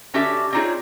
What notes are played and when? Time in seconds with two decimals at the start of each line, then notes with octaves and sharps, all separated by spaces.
0.14 D3 C#4 F#4 G4 A4 E5
0.53 C4 D4 D#4 F4 G#4 C#5